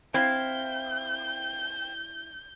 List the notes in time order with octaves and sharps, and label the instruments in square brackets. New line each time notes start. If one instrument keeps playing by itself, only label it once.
[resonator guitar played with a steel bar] C4 [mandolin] E4 F5 [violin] G6